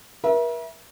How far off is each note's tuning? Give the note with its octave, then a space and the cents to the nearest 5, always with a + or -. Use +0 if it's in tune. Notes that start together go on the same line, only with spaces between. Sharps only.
A#4 +45 E5 +0